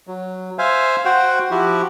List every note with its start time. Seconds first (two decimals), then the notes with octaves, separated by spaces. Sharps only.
0.07 F#3
0.59 C5 E5 F5 G#5
1.05 F#4 C5 F#5 G5
1.51 F3 E4 F#4 G4